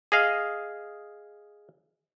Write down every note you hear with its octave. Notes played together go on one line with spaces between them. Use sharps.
G#4 D#5 F5